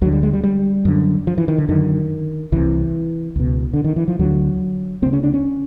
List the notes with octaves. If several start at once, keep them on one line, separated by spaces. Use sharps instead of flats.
D2 D3 F#3
G3
G#3
G3
G3
F#2 D3
F3
E3
D#3
D3
F#2 D3 D#3
C2 C3 E3
C#2 B2
D3
D#3
E3
F3
D2 D3 F#3
D2 C#3 C4
C#4
D4
C#4